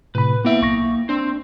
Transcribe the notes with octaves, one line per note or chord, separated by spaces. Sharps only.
A2 C3 B4 B5
A#3 B3 E4 E5 G5
B1 C#6 A#6
C4 D4 C5